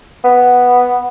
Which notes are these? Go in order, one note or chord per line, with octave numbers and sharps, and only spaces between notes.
B3